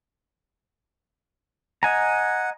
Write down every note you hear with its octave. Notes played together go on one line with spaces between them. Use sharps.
D#5 F#5 G#5 A#5